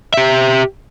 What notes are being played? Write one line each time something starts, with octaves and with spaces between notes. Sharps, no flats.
G4 E5